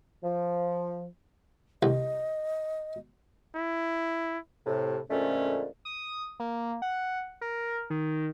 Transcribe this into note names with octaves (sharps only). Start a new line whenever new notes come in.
F3
C2 D#5
E4
A2 C3
F2 A#2 D3 G#3 A3 C#4
D#6
A#3
F#5
A#4
D#3